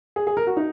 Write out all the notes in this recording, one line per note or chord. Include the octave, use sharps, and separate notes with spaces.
G#4
G#4
A#4
F#4
D#4